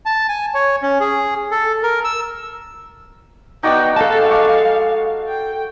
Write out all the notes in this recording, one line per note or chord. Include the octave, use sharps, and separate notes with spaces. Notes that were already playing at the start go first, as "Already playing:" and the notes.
A5
G#5
C#5
C#4
G#4
A4
A#4
E6
B3 D#4 F#4 D5 G5
G#3 A4 F5 A5
C#6 D6
G5